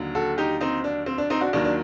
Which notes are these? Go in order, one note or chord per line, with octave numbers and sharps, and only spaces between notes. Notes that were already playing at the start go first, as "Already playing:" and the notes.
Already playing: D#2 D3 F#3
F#4 A4
D#4 G4
C4 D#4
D4
C4
D4
C4 D#4
D4 F#4
D#2 D#3 F#3 D4
D4